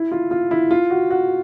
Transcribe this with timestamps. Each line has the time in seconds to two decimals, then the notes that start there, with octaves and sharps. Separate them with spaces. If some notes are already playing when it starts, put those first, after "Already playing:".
Already playing: E4
0.12 F4
0.31 F4
0.51 E4
0.71 F4
0.90 F#4
1.10 F#4